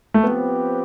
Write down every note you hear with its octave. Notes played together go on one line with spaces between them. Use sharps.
A3
F3 B3 C4 G4 B4